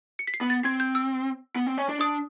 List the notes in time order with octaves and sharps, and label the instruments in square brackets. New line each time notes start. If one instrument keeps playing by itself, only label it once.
[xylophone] C#7
B6
C7
[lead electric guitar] B3
[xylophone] A6
[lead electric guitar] C4 [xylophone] G#6
[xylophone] G6
E6
[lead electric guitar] B3
C4
C#4
D4
[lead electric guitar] D4 [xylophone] D#6